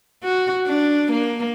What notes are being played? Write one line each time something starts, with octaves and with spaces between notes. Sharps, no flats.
F#4
D4
A#3